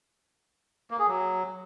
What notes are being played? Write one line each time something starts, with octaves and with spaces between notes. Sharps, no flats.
A#3
G#4
F#3